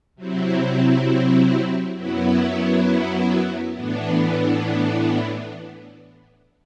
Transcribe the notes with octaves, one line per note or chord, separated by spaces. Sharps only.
C3 F#3 C4 E4
F#2 F#3 B3 E4
A2 E3 B3 D4